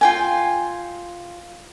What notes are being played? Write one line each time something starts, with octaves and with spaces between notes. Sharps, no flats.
F4 G5 G#5